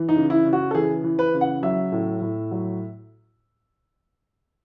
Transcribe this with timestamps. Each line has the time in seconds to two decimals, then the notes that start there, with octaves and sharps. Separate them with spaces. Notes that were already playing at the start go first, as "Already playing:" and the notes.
Already playing: E3
0.09 D#4
0.16 C#3
0.30 E4
0.46 C#3
0.53 F#4
0.71 A4
0.74 E3 G#4
1.04 E3
1.19 B4
1.34 C#3
1.41 F#5
1.63 F#3 E5
1.92 A2
2.21 A2
2.51 F#3